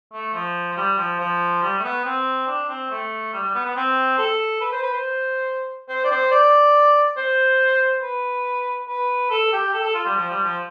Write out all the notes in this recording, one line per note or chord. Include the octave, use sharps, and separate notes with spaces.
A3
F3
F3
G3
F3
F3
G3
A3
B3
C4
D4
C4
A3
G3
G3
B3
B3
C4
A4
B4
C5
B4
C5
C5
D5
C5
D5
C5
B4
B4
A4
G4
A4
A4
F4
G3
F3
G3
F3